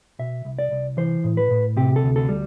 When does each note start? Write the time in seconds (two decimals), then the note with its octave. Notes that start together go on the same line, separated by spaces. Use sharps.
0.19 B2 E5
0.45 C2
0.59 D5
0.71 C2
0.97 E3 C5
1.24 A2
1.37 B4
1.51 A2
1.77 C3 G4
1.96 A4
2.03 D2
2.16 A4
2.29 G3